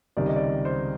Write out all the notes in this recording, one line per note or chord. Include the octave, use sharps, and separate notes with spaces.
C#2 C3 D#3 G3 D5
D#5
D5
C5